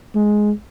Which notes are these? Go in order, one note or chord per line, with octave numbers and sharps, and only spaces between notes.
G#3